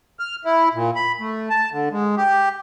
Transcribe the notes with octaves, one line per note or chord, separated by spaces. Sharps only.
F6
E4
A#2
B5
A3
A5
D3
G#3
G4